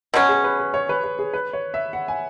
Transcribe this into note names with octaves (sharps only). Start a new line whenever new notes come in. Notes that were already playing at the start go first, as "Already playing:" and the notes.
B2 F#3 C#4 B4
G#4
B4
B4
C#5
B4
B4
G#4
B4
C#5
E5
F#5
G#5